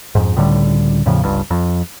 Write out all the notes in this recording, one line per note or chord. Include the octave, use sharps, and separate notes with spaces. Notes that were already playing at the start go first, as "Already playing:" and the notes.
F2 G#2
C#2 A2 D3 G3
E2 A2 C#3 F3
G1 C#2 G2
F2